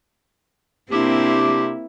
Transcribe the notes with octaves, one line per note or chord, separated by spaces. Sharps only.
C3 A#3 C4 D4 E4 G4